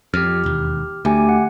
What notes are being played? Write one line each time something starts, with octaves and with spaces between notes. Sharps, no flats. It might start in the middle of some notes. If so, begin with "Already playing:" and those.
F2 G4 F6
E1 D#2
D2 A3 G4 G#5
F#5